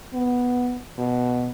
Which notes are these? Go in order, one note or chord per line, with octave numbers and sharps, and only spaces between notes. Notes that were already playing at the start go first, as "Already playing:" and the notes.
B3
B2